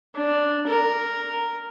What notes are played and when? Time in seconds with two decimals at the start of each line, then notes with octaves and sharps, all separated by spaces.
0.15 D4
0.66 A#4